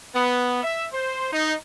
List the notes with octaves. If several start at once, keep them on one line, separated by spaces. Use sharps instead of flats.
B3
E5
C5
D#4